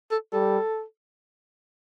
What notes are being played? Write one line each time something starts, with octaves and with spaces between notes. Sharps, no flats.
A4
G3 A4